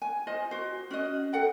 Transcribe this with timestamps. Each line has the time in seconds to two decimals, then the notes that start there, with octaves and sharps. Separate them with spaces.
0.02 G#5
0.27 F4 C5 D#5
0.51 F#4 C5
0.91 C#4 F#4 D#5
1.33 A4 F#5 G5